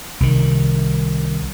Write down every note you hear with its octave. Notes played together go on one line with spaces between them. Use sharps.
C2 D#3